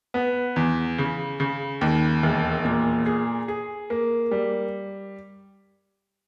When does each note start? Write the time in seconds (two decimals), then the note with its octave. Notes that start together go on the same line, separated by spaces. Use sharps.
0.14 B3
0.56 E2
0.98 C#3
1.40 C#3
1.81 D#2
2.23 E1
2.65 A#2
3.06 G#4
3.48 G#4
3.90 A#3
4.31 G3